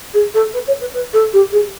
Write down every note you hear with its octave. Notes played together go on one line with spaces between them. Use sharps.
G#4
A4
B4
C#5
B4
B4
A4
G4
G#4